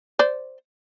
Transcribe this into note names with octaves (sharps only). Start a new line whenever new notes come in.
C5 D5